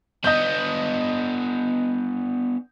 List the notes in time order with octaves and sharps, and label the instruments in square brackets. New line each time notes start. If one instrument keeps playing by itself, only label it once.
[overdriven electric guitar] B3 D4 [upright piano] D#5 G6